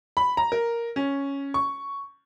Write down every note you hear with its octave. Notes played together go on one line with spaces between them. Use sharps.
B5
A#5
A#4
C#4
C#6